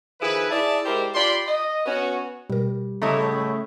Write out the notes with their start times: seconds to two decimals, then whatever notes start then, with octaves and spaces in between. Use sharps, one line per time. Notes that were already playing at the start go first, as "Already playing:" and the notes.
0.20 D#3 F3 E4 G#4 B4
0.50 E4 G#4 D5 E5 A5
0.84 G#3 E4 G4 A#4 C5 D5
1.15 F4 G4 D5 B5 C6
1.47 D#5
1.86 B3 C#4 F#4
2.50 B2 G3 A#4
3.02 A2 C#3 A3 E4 D#5 A#5 D#6